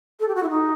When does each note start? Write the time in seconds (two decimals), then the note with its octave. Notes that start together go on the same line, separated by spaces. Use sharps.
0.20 A4
0.28 G4
0.35 F#4
0.43 E4
0.50 D#4